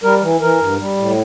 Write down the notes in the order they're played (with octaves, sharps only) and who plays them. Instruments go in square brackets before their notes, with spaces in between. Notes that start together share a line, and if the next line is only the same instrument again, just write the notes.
[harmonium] G3 A#4
E3
E3 A#4
G2
G3
A2